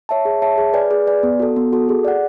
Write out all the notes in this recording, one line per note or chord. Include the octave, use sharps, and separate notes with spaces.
C#5 E5 A5
G#4
C#5 E5 A5
G#4
B4 D5 G#5
G#4
B4 D5 G#5
B3
F#4 A4
B3
F#4 A4
G#4
D5 F#5